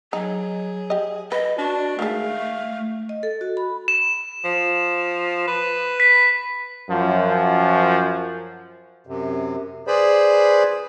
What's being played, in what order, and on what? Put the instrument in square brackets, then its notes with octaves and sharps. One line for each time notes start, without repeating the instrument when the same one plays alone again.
[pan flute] F#3 [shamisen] D#4 [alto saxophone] G#4
[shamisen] G4 D#5
[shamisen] B4 [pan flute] D#5
[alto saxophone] D4 [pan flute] F#4
[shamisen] D#3 G#3 [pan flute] A3 [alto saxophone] F5
[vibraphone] D#5
A4
F#4
B5
[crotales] E7
[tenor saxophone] F3
B4
[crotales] B6
[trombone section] F#2 F3
[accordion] F#2 C3
G#4 B4 C5 D5 B5